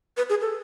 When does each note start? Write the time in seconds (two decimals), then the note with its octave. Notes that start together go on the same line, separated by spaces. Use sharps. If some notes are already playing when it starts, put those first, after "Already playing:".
0.17 B4
0.30 G#4
0.41 A4